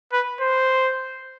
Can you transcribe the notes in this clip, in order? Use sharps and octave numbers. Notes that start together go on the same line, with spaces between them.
B4
C5